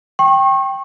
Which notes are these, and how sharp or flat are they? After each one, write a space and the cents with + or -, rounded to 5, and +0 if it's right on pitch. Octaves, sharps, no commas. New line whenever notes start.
G5 +0 C#6 -35